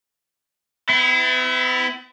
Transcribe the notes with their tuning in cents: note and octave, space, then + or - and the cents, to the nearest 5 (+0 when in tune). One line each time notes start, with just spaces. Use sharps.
B3 +45 E4 +0